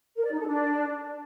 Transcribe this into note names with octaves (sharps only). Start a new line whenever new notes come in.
A#4
D5
D#4
A4
D4